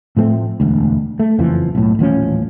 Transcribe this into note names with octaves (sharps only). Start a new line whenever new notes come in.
A2 F3 A3 C4
E1 D2
A3
F#1 F2 E3 F3
B1 A2
D#1 A1 F3 C#4